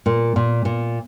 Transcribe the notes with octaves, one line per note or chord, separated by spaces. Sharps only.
A#2
A#2
A#2